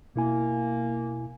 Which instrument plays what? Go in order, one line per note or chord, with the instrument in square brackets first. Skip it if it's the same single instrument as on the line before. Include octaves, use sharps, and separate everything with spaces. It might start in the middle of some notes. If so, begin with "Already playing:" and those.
[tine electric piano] B2 E4 G#5 [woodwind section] A#3